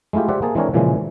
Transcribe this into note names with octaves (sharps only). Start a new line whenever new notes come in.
G#3 A3 E4 F4 G4
G4 C5 D5 E5 F#5
A#3 G#4 A5
E3 G#3 C4 D4 A#4 C#5
A#2 C#3 E3 F3 G#3